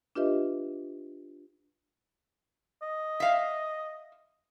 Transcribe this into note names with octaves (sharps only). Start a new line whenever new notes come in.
D4 F4 G4 B4 D#5 E5
D#5
E5 F5